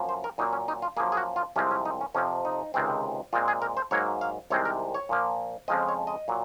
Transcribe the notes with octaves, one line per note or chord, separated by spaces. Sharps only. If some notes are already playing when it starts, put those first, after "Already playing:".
Already playing: F#2 F3 A#3
C5
A#4
A#2 F#3 A#3 D#4
C#4
D#4
F4
F#2 F3 A#3 G#4
G#4
F#4
F4
C2 C3 F3 G#3 C4 C#4
C#4
D#4
C#4
F2 C3 F3 C4 C#4
D#4
C#2 C3 D#3 G#3 C4
A#2 G#3 C4 F4
G#4
A#4
C5
G#2 F#3 A#3 C#5
F5
C2 C3 D#3 G#3 C4 C#5
A#4
C#5
A#2 F3 A#3
F2 C#3 F3 G#3 C4 D#5
C#5
D#5
A#2 F#3